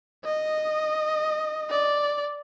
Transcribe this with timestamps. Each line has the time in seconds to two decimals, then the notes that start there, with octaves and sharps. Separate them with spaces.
0.25 D#5
1.70 D5